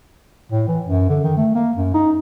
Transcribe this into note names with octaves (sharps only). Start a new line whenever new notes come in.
A2
E3
F#2
D3
D#3
A3
A#3
F#2
D#4